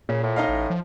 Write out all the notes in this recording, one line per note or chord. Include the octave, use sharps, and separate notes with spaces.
A#2 C#3
A2
D#4 D#5 F5
A1
F3